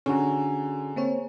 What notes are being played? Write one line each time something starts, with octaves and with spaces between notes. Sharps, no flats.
D3 C#4 F#4 G#4 G#5 A#5
A#3 C4 C#5